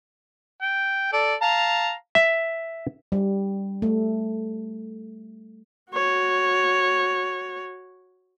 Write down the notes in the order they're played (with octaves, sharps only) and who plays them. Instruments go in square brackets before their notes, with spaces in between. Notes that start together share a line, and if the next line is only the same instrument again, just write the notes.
[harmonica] G5
A4 D5
F5 A5 A#5
[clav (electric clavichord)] E5
[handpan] G3
A3
[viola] F#4 C#5